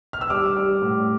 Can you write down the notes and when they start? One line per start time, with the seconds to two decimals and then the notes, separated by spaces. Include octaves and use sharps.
0.13 F6
0.21 E6
0.30 G3 D6
0.56 G3
0.82 A2